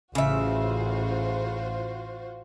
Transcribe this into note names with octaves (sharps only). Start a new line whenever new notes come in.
A1 C#3 F4 F#4 C5 E5